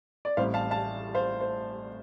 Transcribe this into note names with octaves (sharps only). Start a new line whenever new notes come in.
D5
A1 A2 G3 C4 C5 F5
F5 A5
F5 A5
C5 F5
C5